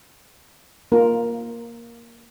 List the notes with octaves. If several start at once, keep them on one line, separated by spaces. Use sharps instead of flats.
A#3 F4 A#4